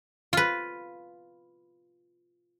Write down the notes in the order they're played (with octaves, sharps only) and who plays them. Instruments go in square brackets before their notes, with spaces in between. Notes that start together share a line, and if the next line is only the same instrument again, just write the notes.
[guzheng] F4 B4